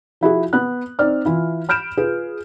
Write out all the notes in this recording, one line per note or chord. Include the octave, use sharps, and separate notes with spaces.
F3 E4 F#4 G#4
B3 F#6
C4 D#4 D5 F6
E3 E4 F4
B5 F6 G6 D7 E7
F4 G#4 B4